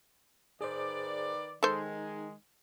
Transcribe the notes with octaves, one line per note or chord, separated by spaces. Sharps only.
D#3 G#4 B4 C5 D5
D#3 G#3 D#4 A4 C5